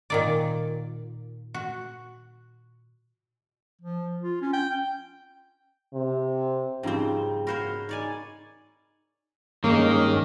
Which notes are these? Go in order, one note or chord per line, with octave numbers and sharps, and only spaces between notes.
A#2 D#3 D5
F#4
F3
F4
C#4
G5
C3
G#2 C#3 F3 G3 C4 D#4 G5
F#4 A#4 C5 C#5 F5 F#5 B5
D#4 C#5 D5 G#5
G2 D#3 G#3 A#3 C#4